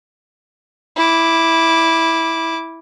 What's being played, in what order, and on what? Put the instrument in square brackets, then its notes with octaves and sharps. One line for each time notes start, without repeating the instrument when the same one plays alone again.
[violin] E4 D6